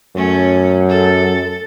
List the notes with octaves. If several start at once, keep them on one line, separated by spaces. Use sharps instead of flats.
F#2 A3 C#4
A4